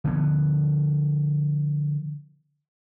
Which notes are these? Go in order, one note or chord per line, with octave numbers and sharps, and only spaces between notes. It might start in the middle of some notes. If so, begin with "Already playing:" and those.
D3 F3 B3